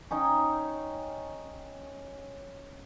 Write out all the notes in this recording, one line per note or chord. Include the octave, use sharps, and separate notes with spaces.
C#4 D#4 G5